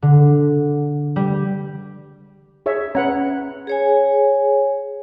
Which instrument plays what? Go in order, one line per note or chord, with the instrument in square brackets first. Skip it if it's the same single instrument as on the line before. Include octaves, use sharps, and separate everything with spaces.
[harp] D3
G3
[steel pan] G#4 C#5 E5
[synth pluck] C#4 [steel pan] B4 F#5 A#5
[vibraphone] G#4 C#5 G#5